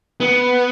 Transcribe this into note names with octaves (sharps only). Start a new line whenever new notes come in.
B3